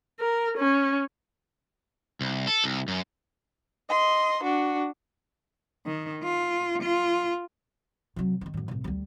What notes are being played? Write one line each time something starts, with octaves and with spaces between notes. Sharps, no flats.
A#4
C#4
C2
A4
C2
F#2
D#5 C6
D4 F#4
D#3
F4
F4
C3 F#3
D#3 E3
F#2 A2
C2 A2
D2 G3